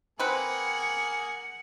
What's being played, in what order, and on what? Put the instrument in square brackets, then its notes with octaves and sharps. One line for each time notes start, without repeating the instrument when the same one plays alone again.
[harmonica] A#3 G#4 [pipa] C4 B4 [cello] F#5